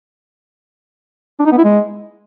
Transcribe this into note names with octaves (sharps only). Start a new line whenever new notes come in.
D4
D#4
B3
E4
G#3